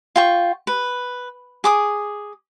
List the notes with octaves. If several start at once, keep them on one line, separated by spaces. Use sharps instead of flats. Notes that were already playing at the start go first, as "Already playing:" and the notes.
F4 G5 C#6
B4
G#4 D6 D#6